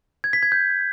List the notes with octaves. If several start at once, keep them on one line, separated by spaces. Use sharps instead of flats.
G#6
B6
G#6
G6